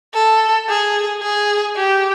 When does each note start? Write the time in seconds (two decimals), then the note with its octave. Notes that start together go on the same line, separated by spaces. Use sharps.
0.14 A4
0.69 G#4
1.23 G#4
1.77 G4